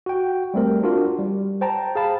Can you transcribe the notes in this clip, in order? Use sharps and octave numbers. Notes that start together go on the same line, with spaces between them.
F#4 G5
G3 A3 C4 A#4
D4 F4 F#4 A#4
G3
C5 G5 A5 A#5
G#4 F5 A5 B5